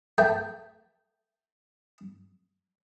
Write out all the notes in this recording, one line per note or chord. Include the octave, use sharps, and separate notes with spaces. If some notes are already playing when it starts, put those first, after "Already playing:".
A3 G5